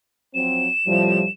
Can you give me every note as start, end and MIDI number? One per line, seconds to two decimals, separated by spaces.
0.35 0.67 53
0.35 0.67 54
0.35 0.67 60
0.35 1.31 100
0.87 1.23 45
0.87 1.23 48
0.87 1.23 53
0.87 1.26 55